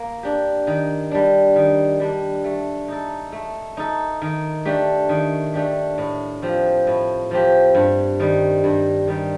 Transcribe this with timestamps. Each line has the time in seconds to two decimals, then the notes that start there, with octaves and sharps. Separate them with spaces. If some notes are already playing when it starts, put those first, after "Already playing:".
Already playing: A#3
0.23 D4 G4
0.67 D#3
1.11 G3 D4
1.56 D#3
2.00 G3 D4
2.44 A3
2.88 D#4 A4
3.32 A3
3.77 D#4 A4
4.22 D#3
4.65 A3 D4 G4
5.09 D#3
5.54 A3 D4 G4
5.98 A2
6.42 F3 C4 G4
6.87 A2
7.31 F3 C4 G4
7.75 G2
8.20 D#3 G3
8.64 G2
9.07 D#3 G3